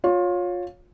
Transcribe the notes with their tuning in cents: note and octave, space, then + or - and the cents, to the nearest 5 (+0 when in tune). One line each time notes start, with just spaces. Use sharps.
F4 +25 C#5 +0